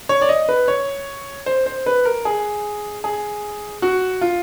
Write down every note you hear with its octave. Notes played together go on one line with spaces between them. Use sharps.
C#5
D5
D#5
B4
C#5
C5
C5
B4
A#4
G#4
G#4
F#4
F4